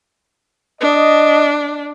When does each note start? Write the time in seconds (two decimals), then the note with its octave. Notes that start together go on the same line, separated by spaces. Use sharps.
0.81 D4 D#5